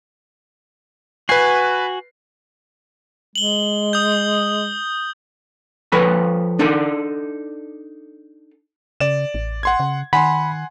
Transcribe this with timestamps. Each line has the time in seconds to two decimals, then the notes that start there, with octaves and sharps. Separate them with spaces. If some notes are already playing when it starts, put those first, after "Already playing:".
1.29 F#4 B4 G#5 C7
3.35 G#3 F#7 G7
3.93 D#6 G6
5.92 F3 A4 B4 C#5 F#5 B5
6.59 D4 D#4 A4 D5
9.00 C#3 D5 E7
9.34 A1
9.63 F#5 C6 G#6
9.80 C#3
10.13 D#3 F#5 G#5 B5 C6